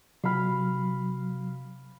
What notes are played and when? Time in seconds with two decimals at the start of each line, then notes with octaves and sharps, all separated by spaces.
0.24 C3 F#3 F5 B5 F6